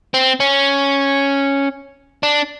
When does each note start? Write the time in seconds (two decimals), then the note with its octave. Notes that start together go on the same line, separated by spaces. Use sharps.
0.14 C4
0.40 C#4
2.23 D4